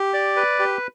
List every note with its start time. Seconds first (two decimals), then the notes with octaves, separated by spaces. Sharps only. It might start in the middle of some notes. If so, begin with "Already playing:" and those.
Already playing: G4
0.14 D5
0.36 B4
0.59 G4